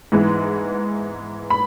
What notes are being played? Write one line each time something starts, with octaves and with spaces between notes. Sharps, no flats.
G#2 E3 G#3 B3
B5